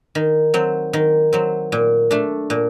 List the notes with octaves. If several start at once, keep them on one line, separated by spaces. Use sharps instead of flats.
D#3
F#3 C4
D#3
F#3 C4
A#2
A3 D4
A#2